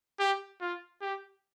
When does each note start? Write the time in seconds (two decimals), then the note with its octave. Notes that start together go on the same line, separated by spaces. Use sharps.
0.19 G4
0.61 F4
1.01 G4